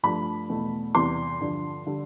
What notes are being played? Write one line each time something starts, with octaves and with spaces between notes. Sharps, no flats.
G2 F3 A3 B5
E2 B2 A3
E2 C3 E3 G3 C6
G2 D3 F3
D3 G3